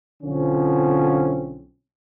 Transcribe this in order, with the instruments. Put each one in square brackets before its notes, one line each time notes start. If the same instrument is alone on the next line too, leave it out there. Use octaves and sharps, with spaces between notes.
[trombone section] B1 D3 F3 C4 C#4